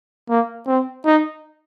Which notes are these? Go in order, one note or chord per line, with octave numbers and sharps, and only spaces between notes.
A#3
C4
D#4